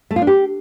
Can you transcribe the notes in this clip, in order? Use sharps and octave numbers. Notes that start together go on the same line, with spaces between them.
A3
F4
D4
G4